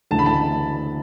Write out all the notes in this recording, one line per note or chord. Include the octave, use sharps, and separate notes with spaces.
D2 C#3 E3 A5
B5
A5